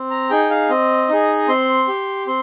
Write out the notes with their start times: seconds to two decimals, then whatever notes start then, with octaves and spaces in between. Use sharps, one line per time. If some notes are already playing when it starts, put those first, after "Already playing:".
Already playing: C4
0.10 A#5
0.30 D#4 G#4 G5
0.50 F5
0.70 C4 D#5
1.09 D#4 G#4
1.48 C4 C6
1.88 G4
2.27 C4 C6